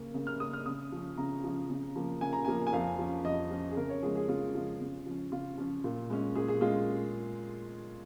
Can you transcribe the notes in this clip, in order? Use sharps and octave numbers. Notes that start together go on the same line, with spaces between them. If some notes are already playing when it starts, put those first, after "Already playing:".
Already playing: C#3 A#3 C#4
C#3
F6
A#3 C#4 D#6
F6
C#3 D#6
F3 C#4
C#3 A#5
F3 C#4
C#3
F3 A#3
C#3 G#5
A#5
F3 A#3 G#5
G#5
F2 F5
F3 C#4
F2 D#5
F3 C#4
G#4
C#3 A#4
C#5
F3 G#3 G#4
G#4
C#3 F4
F3 G#3
C#3
F3 C#4
C#3 F4
F3 C#4
A#2
G#3 C#4
A#2 G#4
G#4
G#3 C#4 F4